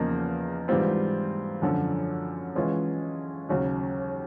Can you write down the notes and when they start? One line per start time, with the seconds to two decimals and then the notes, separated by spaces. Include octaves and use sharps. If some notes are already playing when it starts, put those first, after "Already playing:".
Already playing: E2 C#3 F3 A#3 D#4
0.68 G#2 E3 G3 C4 F4
1.62 F#2 D3 F3
2.56 E3 G#3 C#4 F4
3.49 D#2 C#3 F#3